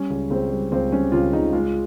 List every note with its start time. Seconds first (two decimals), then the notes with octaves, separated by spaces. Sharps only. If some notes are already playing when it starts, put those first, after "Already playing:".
Already playing: G3 C#4
0.10 C#2
0.30 C#2 C4
0.51 G3
0.72 C#2 C4
0.92 G3 C#4
1.12 C#2 F4
1.33 C#2 D#4
1.53 G#3 F4